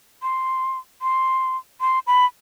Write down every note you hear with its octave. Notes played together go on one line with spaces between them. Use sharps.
C6
C6
C6
B5